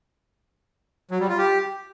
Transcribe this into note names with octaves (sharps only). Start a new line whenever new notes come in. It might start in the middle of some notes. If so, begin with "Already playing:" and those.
F#3
G3
F4
G4